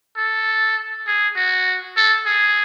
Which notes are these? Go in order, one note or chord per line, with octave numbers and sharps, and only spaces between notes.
A4
G#4
F#4
A4
G#4